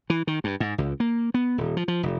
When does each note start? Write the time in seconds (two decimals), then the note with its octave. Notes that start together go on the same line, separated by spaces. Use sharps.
0.10 E3
0.27 D#3
0.44 G2
0.60 G#2
0.78 C#2
1.00 A#3
1.34 B3
1.58 D#1
1.77 F3
1.88 F3
2.03 F1